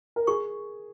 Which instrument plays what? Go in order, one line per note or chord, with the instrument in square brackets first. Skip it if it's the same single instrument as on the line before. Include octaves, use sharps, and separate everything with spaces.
[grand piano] A#4
[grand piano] G#4 [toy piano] C#6